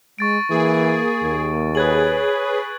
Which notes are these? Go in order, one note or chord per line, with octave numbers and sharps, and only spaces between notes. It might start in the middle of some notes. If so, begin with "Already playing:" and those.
G#3 C#6 A6 D7
E3 A#3 G#4
D#2
G#4 B4 C#5 F#6 G#6 F#7